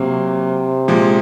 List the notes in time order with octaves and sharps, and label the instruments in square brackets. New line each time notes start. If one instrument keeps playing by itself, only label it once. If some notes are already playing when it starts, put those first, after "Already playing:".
Already playing: [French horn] C3 [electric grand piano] F#3 A#3
[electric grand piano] A#2 F3 G#3